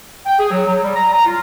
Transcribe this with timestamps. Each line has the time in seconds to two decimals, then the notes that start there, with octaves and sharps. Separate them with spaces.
0.25 G5
0.39 G#4
0.51 F#3
0.66 F#3
0.83 G3
0.95 A#5
1.11 A#5
1.26 F4